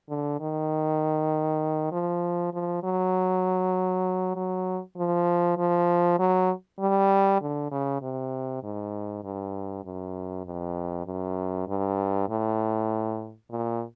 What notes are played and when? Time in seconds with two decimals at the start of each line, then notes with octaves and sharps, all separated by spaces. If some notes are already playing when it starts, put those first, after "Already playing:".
0.09 D3
0.40 D#3
1.92 F3
2.53 F3
2.83 F#3
4.36 F#3
4.97 F3
5.57 F3
6.19 F#3
6.79 G3
7.41 D3
7.71 C#3
8.02 C3
8.63 G#2
9.24 G2
9.84 F#2
10.45 F2
11.06 F#2
11.67 G2
12.29 A2
13.51 A#2